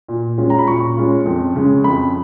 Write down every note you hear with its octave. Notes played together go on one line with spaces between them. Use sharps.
A#2
G#3 C#4 F4
A#5
B5
A#2 C#6
G#3 C#4 F4
F2
C#3 G#3
F2 B5